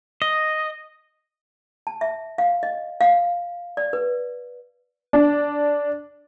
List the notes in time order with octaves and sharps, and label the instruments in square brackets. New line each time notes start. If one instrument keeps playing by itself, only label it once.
[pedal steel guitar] D#5
[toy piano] A5
E5
F5
D#5
F5
D5
B4
[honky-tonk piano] D4